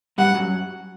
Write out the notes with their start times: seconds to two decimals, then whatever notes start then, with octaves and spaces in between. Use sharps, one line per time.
0.18 G2 G3 F#5
0.35 F#2 F#3